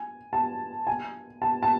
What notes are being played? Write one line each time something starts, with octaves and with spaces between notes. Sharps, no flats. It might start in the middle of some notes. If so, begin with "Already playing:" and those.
Already playing: G#5
A5
G#5
A5
A5